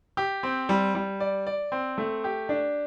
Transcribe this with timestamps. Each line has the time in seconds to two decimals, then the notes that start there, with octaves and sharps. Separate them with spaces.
0.17 G4
0.43 C4
0.69 G3
0.95 G3
1.20 D5
1.47 D5
1.72 C4
1.98 A3
2.24 G4
2.49 D4